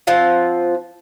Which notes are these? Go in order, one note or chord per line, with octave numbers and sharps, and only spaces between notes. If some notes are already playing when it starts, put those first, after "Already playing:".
F3 C4 F4 F#5